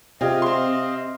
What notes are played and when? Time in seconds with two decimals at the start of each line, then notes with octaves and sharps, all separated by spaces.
0.21 C3 F4 G4 G#4 D#5 F5
0.42 C4 C6